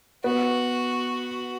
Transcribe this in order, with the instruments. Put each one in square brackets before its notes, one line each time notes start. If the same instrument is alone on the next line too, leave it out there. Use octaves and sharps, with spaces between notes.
[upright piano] B3 [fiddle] F#4